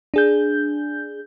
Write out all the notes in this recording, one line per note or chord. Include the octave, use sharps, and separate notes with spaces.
D4 G#4 G6